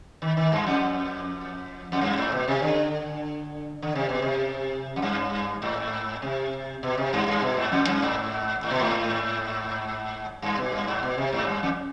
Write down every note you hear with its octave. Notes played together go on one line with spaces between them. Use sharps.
D#3
D#3
G2
F2
F2
G2
G#2
B2
C3
D3
D3
C3
B2
C3
F2
G2
G#2
C3
B2
C3
G2
G2
B2
G#2
F2
G2
G#2
G#2
B2
G#2
G2
B2
G2
G#2
B2
C3
G#2
G2
F2